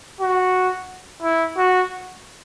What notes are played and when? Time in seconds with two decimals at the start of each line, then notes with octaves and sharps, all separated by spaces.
0.21 F#4
1.22 E4
1.58 F#4